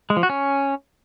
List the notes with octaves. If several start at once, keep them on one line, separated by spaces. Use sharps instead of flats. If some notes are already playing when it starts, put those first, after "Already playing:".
G#3
F3
F#4
C#4